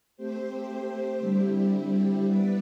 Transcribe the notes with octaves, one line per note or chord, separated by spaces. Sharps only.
A3 C4 G4 C5
D3 G3 C4 E4 G4
G3 B3 E4 B4 D5